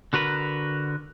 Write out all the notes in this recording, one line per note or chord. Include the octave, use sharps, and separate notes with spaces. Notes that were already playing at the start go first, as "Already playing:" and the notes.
D3 F#4 A#4 B4